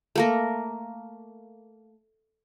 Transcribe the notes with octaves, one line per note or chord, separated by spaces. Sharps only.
A3 A#3 A#4